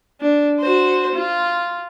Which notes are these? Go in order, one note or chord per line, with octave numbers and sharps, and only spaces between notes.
D4
F#4 C5
F4